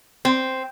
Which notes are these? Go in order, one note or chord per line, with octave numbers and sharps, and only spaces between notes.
C4